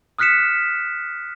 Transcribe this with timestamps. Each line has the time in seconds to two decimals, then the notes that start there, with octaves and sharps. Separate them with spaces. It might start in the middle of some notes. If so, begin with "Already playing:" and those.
0.19 D#6 F6 F#6 B6 C#7 E7